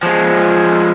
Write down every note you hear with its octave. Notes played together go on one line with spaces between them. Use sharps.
F3 G#3